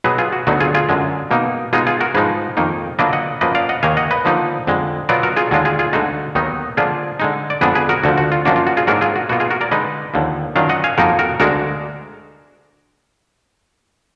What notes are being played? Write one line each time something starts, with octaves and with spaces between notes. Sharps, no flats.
B2 F#3 B3 G#4 B4
F4 G#4
F#4
D2 D3 F#3 B3 D#4 F#4
F4 G#4
F4 G#4
F#2 D3 G#3
B2 A#3 D#4
B2 G#3 D#4 F4 G#4
F4 G#4
F#4 A#4
G#2 F3 G#3 D#4 G#4 B4
F2 D#3 A#3 D#4
D3 F#3 A#3 D4 F4 B4 D#5
D#5 F#5
F#2 F3 A#3 B4 D#5
D5 F5
D#5 F#5
D#2 D#3 A#3 F5 G#5
D#5 F#5
B4 D#5
D3 F3 A#3 D#4
F2 D3 G#3
B2 F#3 B3 F4 A#4 D5
F#4 A#4
F4 G#4
D#2 D3 G#3 D4 F4 F#4
F4 G#4
F4 G#4
D2 D3 G#3 D#4 F#4
D#2 D#3 F#3 B3 D#4
D3 F3 A#3 D4 F4 G#4
D3 G#3 D#4
D5
F2 D3 G#3 B3 D4 G#4 B4
G#4 B4
F#4 A#4
D2 D3 F3 F#4
F#4
F4
F#2 F3 A#3 D4 F#4
F4
F#4
F4 G#4
G#2 F#3 A#3 D4 F#4 A#4
F4 G#4
F#4
B2 A#3 F4 F#4
F4 G#4
F#4 A#4
A#4 D5
D3 G#3 D#4 B4 D#5
D#2 D3 F3
F#2 D#3 F#3 D4 F4 D5 F5
D#5 F#5
F5 G#5
F2 F3 A#3 D#4 F#4 A#4
F#4 A#4
D2 D3 G#3 D4 F#4 A#4